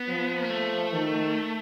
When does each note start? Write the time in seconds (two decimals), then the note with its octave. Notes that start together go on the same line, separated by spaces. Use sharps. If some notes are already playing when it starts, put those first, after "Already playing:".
Already playing: B3
0.09 F3
0.42 A#3
0.50 A3
0.93 D#3